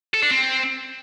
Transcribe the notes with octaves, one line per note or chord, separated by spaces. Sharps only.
A4
D4
C4